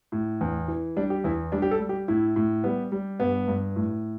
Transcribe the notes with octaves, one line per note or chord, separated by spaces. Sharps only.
A2
E2
E3
G3 D4
G4
E2 E4
G3 D4
G4
A4
G3
G4
A2 E4
A2
G3 B3
G3
G2 B3
G2
A2